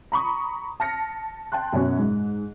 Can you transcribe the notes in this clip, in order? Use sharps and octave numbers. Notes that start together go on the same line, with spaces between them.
A#5 B5 C#6 D#6
A5 F6 A#6 C#7
G5 A5 C6 F#6
F#2 B2 C#4 F#4
G#2